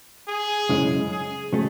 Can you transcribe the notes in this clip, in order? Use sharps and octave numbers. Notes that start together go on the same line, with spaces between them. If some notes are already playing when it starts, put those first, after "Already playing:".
G#4
F#2 C#3 G#3 C#4 E4
G#4
C#3 F#3 A3